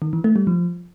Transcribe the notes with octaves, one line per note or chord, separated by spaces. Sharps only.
D#3
E3
A3
G3
F3